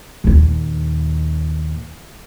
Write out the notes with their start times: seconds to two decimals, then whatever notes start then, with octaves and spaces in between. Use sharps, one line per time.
0.24 D#2 A#2